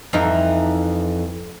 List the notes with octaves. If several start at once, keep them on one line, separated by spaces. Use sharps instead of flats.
F2 E3 D#4